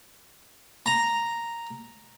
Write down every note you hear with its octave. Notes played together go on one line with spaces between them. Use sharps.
A#5